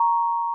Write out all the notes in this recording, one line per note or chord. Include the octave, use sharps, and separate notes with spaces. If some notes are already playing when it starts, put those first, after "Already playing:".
Already playing: A#5 C#6